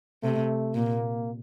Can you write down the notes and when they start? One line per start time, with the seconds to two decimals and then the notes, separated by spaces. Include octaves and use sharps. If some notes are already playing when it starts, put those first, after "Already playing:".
0.23 C3 A3
0.75 A#2 A#3